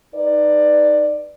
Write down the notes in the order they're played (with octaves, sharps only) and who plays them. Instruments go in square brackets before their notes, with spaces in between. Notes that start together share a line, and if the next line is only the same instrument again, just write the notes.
[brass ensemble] D#4 B4 D5